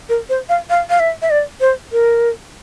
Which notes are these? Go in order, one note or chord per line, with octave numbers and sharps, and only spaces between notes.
A#4
C5
F5
F5
F5
E5
E5
D5
C5
A#4